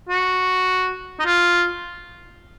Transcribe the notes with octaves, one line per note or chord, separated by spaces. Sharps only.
F#4
D#4
F4